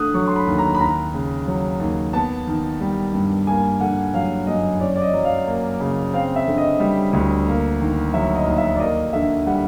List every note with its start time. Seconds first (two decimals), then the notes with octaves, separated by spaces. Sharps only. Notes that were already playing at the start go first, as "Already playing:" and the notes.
Already playing: D3 A3 D#6 F#6
0.14 F#3 C#6
0.28 C6
0.36 B5
0.47 D#2
0.58 A#5
0.74 B5
0.81 D#2 A#5
1.14 C#3
1.47 F#3
1.80 D#2
2.13 B3 A5
2.47 D#3
2.80 G3
3.13 G2
3.47 A#3 G#5
3.80 D3 F#5
4.14 F#3 F5
4.47 F#2 D#5
4.80 C#4 D5
4.96 D5
5.02 D#5
5.13 F#3
5.24 F5
5.47 A#3
5.80 C#3
6.14 C4 F5
6.36 E5
6.46 D3
6.58 D#5
6.80 G3
7.13 D2
7.47 A#3
7.80 D#3
8.14 F#3 E5
8.35 D#5
8.47 D#2
8.58 E5
8.76 D5
8.80 A#3 D#5
9.13 D3 E5
9.47 G3 F#5